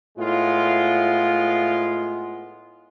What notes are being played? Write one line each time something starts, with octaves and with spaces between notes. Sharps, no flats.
A2 G#3 B3 F4